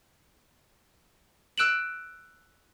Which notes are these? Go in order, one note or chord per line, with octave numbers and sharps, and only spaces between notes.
E6 F#6 D7 E7 F#7